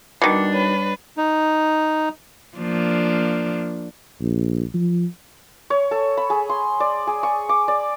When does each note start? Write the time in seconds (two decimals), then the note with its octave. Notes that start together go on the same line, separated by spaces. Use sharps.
0.22 B2 D#3 G3 D4 D6 C#7
0.53 B4 C#5
1.17 D#4
2.58 F3 A#3 D4
4.21 A#1
4.74 F3
5.70 C#5
5.91 A4
6.17 B5
6.30 G#4
6.49 C6
6.80 D5
7.07 G#4
7.23 C#6
7.49 D6
7.68 D5